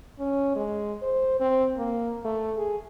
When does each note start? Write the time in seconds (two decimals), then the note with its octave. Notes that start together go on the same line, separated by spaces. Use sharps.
0.19 C#4
0.55 G#3
1.02 C5
1.40 C4
1.77 A#3
2.25 A3
2.58 G#4